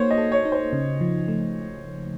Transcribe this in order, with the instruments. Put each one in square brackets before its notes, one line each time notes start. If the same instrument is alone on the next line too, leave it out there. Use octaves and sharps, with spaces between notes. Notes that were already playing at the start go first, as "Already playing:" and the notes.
Already playing: [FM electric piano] A#3 D#4 F#4 [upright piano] C5 C#5
[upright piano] D#5
[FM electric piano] A4
[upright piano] C#5
[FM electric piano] D#4
[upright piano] C5
[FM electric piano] C#3
F3
A3